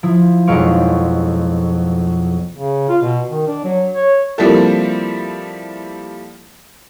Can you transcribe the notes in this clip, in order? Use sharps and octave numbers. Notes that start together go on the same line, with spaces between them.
F3 E4
B1 F2 G#3 F5 C#6 D7
C#3
F4
B2
D#3
D4
F#3
C#5
F3 G3 A#3 C4 E4 A4